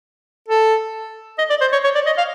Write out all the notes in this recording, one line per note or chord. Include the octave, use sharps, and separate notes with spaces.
A4
D#5
D5
C5
C#5
C#5
D5
D#5
F5